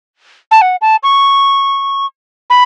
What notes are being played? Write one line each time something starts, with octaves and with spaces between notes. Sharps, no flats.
A5
F#5
A5
C#6
B5